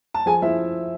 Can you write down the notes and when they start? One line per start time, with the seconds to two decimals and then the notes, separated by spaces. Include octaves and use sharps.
0.14 A5
0.26 F3 G#4 G#5
0.42 F3 E4 E5